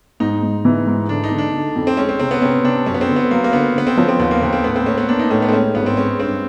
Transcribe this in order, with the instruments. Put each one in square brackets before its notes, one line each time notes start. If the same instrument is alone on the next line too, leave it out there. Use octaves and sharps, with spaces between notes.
[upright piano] G#2 [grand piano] D#4
[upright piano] G#2
E3
G#2
[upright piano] D3 [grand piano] D4
[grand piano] D#4
[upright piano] D3
[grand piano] D4
[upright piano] D3
F2
[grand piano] C4
[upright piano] G#3 [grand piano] C#4
[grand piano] C4
[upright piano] C3 [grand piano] C4
[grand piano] B3
[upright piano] C3 [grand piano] C#4
[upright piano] C3 [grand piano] D4
[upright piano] F#2 [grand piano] C#4
[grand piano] B3
C4
[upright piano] D3
[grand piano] B3
[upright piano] F#3 [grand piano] A#3
[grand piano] A#3
[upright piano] D3 [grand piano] B3
[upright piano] D3 [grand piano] B3
[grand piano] C4
[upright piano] F3 [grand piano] C#4
[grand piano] C4
[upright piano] D#2 [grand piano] B3
[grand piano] A#3
[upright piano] D#2 [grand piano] B3
[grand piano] C4
[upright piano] A2 [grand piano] B3
[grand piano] C4
[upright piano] A#3 [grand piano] C#4
[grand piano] B3
[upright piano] A#3 [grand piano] D4
[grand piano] D#4
[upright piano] A2 [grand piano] C#4
[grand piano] B3
C4
[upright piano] G#3 [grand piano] C#4
[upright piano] G#1 [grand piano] B3
[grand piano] C4
[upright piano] G#3 [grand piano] C#4
[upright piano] G2 [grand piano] C4